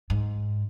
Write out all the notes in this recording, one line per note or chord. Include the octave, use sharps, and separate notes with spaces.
G#2